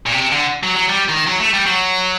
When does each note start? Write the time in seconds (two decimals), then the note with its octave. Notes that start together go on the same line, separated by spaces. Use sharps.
0.06 A#2
0.12 C3
0.32 D3
0.63 F#3
0.76 F#3
0.89 G3
1.08 D#3
1.27 F#3
1.40 A3
1.53 G3
1.66 F#3